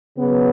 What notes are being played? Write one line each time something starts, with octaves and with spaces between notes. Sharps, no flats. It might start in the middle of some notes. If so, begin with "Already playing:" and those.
C#3 F#3 B3